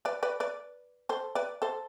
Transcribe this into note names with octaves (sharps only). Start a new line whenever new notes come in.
B4 D5
B4 D5
B4 D5
A4 C5
B4 D5
A4 C5